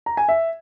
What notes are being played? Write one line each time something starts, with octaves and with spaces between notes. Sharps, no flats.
A#5
G#5
E5